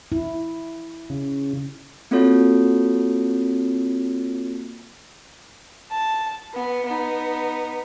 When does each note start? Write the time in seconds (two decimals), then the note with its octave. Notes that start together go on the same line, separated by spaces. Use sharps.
0.12 E4
1.10 C#3
2.11 A#3 C4 F4 F#4 A4 C#5
5.91 A5
6.54 B3
6.86 B3 D#4